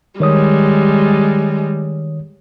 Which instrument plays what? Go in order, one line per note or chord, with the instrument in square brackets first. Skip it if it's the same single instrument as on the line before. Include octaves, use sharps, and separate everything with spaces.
[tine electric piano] D#3 C#5 D#6 [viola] G3 G#3